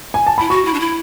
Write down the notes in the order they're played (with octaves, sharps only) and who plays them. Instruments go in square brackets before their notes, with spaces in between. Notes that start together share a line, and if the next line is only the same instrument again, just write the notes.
[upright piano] G#5
A5
[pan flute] E4 [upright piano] B5
[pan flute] F#4 [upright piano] C#6
[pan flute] E4
D4
E4